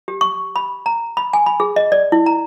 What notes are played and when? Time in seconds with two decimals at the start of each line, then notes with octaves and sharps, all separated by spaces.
0.08 G4
0.21 C#6
0.56 B5
0.86 A#5
1.17 B5
1.33 G#5
1.46 B5
1.60 G#4
1.76 D#5
1.92 D5
2.12 E4
2.26 A#5